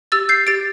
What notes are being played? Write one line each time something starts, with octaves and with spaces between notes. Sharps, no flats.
G4 E6 A6
G6 C7
G4 A6 D7